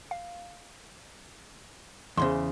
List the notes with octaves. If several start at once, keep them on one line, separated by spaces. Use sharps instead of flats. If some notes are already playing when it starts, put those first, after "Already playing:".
F5
E2 A#2 C#3 C5 C6